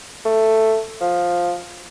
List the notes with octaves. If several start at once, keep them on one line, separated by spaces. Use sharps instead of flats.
A3
F3